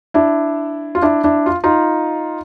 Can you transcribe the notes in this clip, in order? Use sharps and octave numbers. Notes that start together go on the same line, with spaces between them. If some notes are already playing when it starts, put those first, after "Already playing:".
D4 E4
F4
D4 E4
D4 E4
F4
D#4 F4